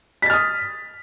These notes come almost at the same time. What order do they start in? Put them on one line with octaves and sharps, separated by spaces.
B6 A6 F6 D#6